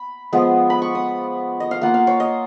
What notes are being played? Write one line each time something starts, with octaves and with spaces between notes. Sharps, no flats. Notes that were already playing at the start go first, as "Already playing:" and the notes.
Already playing: B5
F3 G#3 B3
B5
C#6
D#6
D#5
F5
A#3 F4 F#5
F5
C#5
D#5